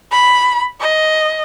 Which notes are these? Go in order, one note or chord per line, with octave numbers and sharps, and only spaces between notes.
B5
D#5